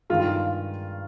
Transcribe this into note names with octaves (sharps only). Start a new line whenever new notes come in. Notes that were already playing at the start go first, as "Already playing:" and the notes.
G2 D#3 G#3 F4
F4